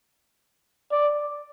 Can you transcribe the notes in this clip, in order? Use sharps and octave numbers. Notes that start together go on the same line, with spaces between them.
D5